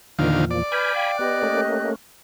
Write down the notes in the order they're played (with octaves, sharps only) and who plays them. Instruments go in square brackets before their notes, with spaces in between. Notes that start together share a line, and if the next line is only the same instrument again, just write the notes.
[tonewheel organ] E2 A#2 F3 [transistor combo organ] D3 D#3 F5
[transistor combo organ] D5
[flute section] B4 F6 G6 [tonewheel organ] G#5 B5
[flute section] F5 G5
[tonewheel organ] B3 [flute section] G4 D#5 F#6
[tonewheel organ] A3 A#3 C#4